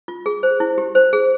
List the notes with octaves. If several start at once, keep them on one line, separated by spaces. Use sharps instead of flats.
F4
G#4
C5
E4
G4
C5
G#4